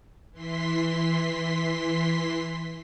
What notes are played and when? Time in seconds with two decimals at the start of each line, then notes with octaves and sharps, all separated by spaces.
0.32 E3 C6 B6